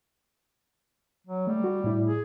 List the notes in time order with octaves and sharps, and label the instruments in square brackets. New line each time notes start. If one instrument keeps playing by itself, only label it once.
[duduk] F#3
[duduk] G3 [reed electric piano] A3
[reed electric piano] F#4
A2 E4
[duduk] G#4